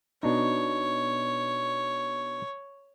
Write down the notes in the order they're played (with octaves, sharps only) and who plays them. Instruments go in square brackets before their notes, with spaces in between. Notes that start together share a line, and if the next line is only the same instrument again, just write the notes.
[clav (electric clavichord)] B2 D4 D#4 [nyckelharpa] C#5